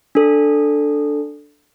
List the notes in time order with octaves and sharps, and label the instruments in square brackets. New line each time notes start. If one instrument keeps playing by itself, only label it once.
[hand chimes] D4 A4